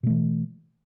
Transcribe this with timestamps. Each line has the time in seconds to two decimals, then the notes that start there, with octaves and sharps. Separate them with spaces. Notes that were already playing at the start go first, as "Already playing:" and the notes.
0.03 B2
0.07 A3
0.10 E3